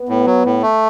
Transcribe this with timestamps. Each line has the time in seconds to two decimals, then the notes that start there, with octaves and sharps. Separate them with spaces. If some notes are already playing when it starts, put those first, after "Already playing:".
Already playing: B3
0.09 A2
0.26 F#3
0.45 A2
0.62 A3